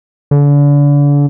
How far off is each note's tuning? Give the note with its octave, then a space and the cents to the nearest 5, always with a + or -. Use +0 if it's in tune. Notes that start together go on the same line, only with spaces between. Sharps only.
D3 -35